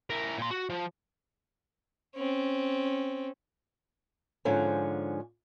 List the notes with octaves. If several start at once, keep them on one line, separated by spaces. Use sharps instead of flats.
E4 A#4
A#2 C6
F#4
F3
C4 C#4
G#2 D3 F3 C#4